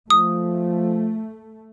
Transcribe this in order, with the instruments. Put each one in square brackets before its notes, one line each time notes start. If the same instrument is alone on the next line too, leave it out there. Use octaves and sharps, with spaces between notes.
[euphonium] F3 [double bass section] A3 [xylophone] D#6